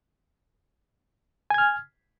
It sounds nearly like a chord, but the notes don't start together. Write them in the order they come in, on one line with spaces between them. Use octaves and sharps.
G#5 G#6 F6